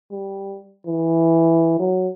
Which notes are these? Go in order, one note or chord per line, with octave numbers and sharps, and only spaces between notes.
G3
E3
F#3